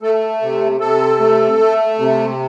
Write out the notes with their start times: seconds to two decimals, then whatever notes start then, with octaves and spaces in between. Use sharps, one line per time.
0.02 A3 A4
0.42 C3
0.80 C3 A4
1.20 A3
1.59 A3
1.99 C3